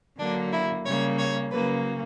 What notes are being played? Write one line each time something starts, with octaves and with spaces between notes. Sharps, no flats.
D3 F#3 A#3 D4
E4
C#3 G3 A#3 C#5
C#5
C#3 F#3 A#3 B4